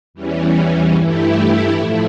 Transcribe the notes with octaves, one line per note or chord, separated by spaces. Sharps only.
E2 E3 G3 C#4
G2 E3 A3 E4 G4
A2 F3 A3 E4